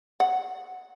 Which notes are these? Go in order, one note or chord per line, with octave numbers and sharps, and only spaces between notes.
F#5